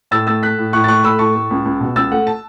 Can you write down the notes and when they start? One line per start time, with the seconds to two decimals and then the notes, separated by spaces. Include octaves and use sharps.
0.11 A2 E6 A6
0.27 A3 E6 A6
0.43 A3 F#6 B6
0.58 A2
0.73 A2 C#6 F#6
0.84 A6
0.88 A3 C#6 F#6
1.04 A3 B5 E6
1.19 A2 A5 C#6
1.35 A3
1.50 C#2
1.65 C#2
1.80 B2
1.96 C#2 E6 A6
2.11 A3 F#5
2.27 A5